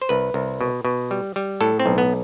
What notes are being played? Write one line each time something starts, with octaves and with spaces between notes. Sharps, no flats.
C5
C2 B4
C2
B2
B2
G3
G3
A2 A4
C4
B1
B3